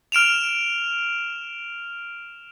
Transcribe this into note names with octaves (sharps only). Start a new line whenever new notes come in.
F6 D7 E7 F7